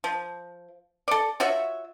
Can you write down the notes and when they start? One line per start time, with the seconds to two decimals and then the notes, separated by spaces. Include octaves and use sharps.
0.04 F3
1.08 A4 D5
1.40 F4 F#4 C#5 E5